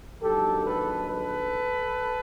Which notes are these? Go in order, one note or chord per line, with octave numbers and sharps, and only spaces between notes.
A#1 G#2 D#3 F#3 G4 A4
A4 B4
A4 B4